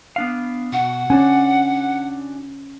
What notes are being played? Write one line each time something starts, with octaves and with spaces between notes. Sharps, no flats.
B3 D4 F5
B2 F#4 F#5
C#4 D4 F#4 G#5